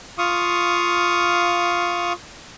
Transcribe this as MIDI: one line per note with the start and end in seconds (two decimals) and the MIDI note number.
0.18 2.13 65
0.18 2.13 77
0.18 2.13 85
0.18 2.13 87